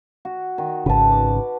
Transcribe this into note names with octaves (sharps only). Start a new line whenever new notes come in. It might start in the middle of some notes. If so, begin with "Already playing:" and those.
F#4
D#3
G#1 C#3 B4 A5
D6